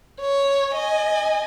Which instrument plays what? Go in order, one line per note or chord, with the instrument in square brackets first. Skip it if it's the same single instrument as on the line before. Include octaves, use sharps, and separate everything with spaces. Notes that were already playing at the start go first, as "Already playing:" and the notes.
[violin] C#5
D#5 G#5